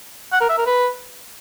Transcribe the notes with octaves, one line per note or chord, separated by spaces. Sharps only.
F#5
A#4
E5
A#4
B4